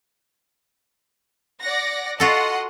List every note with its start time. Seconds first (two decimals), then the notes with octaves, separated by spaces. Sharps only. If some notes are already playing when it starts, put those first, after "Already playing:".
1.61 D5 F#5 A#6
2.20 F4 F#4 A4 D#5 F#5 C6